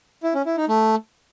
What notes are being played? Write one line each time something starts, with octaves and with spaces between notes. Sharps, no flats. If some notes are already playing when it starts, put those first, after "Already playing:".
E4
C#4
E4
D#4
A3